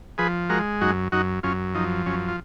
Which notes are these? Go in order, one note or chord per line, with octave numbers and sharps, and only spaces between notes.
F3 G#4 B4
G#3 F#4 A#4
F#2 D#4 F#4
F#2 D#4 F#4
F#2 C#4 F4
F3 D#4
F#2 C#4
F4